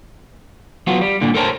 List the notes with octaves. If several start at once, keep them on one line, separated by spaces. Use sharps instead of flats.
F#3 B3 F4
G3
G2 A#2 D3
A4 A#4 C5 C#5 A5